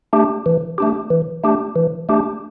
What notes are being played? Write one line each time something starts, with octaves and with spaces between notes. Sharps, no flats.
A3 D4 G4
E3
A3 D4 G4
E3
A3 D4 G4
E3
A3 D4 G4